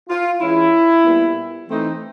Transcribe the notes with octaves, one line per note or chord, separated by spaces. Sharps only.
F4
E3 G#3 C#4 E4
A#2 G3 B3
E3 A3 C4 D#4